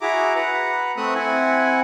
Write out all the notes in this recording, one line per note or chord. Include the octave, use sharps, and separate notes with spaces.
E4 F#4 G#4 E5 A#5 D6
B4 F#5 A#5
A3 C4 E5 D#6 F#6
C4 E4 F#5 G#5